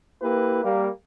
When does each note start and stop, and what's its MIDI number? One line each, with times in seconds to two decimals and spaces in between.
0.22 0.63 58
0.22 0.63 64
0.22 0.63 67
0.22 0.63 71
0.64 0.89 55
0.64 0.89 58